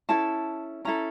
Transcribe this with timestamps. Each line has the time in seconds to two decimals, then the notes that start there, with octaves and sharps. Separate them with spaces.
0.09 C#4 E4 A4 A5
0.85 C#4 E4 A4 A#5